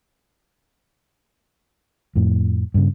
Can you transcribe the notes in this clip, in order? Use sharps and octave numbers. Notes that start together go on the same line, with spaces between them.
F2 A2
G2 C#3